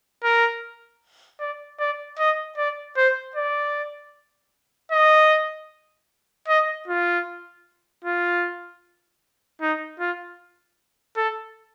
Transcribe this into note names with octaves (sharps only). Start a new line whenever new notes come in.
A#4
D5
D5
D#5
D5
C5
D5
D#5
D#5
F4
F4
D#4
F4
A4